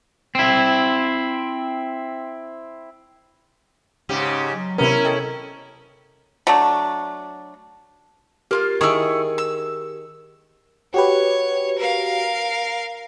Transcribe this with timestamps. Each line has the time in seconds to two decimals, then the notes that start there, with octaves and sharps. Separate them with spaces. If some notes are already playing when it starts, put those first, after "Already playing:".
0.35 C4 E4
4.09 G#2 C#3 G4
4.51 F#3
4.78 C3 B3 C#4 E4 A#4
5.04 A4 D#5 G5
6.47 F#3 A3 D4
8.51 A#3 F4 G4 A#4 F6
8.81 D#3 E4 G#4 C#6
9.38 E6
10.94 F#4 G4 B4 C#5
11.79 A#4 F5